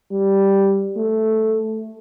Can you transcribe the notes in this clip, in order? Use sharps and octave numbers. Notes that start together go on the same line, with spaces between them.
G3
A3